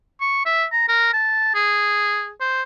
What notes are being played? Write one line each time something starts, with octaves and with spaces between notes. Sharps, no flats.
C#6
E5
A#5
A#4
A5
G#4
C5